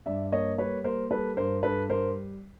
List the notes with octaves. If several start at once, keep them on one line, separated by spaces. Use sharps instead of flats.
G2 D5 E5
A#3 C#5 D#5
G3 B4 C#5
A#3 A#4 C5
G3 A4 B4
G2 A#4 C5
G2 A4 B4
G3 A#4 C5